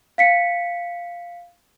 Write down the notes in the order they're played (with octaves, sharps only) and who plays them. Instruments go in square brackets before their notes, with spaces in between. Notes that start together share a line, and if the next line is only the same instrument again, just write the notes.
[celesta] F5 B6 C#7